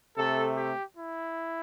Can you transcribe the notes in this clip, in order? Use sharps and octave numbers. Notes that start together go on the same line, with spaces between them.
C3 A3 A4
G4
E4